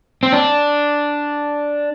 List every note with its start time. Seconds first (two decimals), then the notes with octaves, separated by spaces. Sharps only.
0.23 C4
0.33 D4